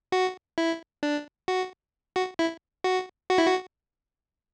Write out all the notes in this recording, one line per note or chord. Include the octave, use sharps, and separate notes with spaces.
F#4
E4
D4
F#4
F#4
E4
F#4
F#4
E4
F#4